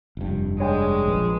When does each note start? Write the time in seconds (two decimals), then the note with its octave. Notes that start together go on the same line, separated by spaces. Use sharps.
0.17 F1 G2
0.59 G#3 D4 C#5 G5
1.07 A#1 B4